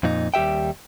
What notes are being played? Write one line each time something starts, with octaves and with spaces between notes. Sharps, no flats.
F2 A#2 D#4
D#2 G3 G4 E5 G5